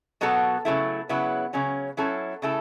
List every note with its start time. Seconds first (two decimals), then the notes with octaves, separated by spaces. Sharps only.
0.21 B2 F#3 B3 F#4 A4
0.65 C#3 F#3 A3 E4
1.09 C#3 F#3 B3 E4
1.53 C#3 F#3 C#4
1.97 F#3 C#4 E4 A4
2.42 C#3 A3 E4 A4